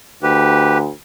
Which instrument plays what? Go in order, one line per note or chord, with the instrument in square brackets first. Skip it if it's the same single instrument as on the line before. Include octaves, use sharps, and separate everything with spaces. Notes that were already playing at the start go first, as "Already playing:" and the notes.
[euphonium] D2 [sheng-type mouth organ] G4 B4